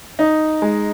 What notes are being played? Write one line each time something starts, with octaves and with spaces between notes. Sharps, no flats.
D#4
G#3